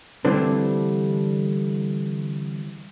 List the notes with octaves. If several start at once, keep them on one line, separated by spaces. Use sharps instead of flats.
D3 E3 G3 A3 C4 D4